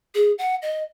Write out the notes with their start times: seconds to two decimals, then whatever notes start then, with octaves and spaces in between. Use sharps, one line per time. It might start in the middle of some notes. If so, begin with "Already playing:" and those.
0.15 G#4
0.38 F#5
0.62 D#5